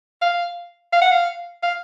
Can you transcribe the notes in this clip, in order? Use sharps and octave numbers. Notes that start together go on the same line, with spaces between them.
F5
F5
F#5
F5
F5